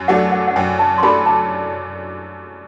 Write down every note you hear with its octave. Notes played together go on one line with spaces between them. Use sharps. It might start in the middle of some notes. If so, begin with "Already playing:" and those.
Already playing: F#2
F#3 A3 D4 A4 F#5
F#5
F#5
F#2 G5
A5
C6
F#3 A3 D4 A4 B5
A5